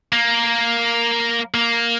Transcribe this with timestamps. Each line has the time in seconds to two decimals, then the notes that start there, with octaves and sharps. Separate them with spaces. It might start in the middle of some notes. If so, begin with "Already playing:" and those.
0.12 A#3
1.54 A#3